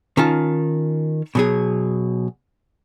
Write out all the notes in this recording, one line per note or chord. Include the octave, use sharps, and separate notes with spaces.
D#3 C#4 F4 A5
B2 F#3 G#4